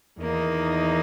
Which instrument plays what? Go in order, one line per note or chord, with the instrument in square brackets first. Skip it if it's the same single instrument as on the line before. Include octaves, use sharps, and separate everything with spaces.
[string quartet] E2 D#3 A#3 D#4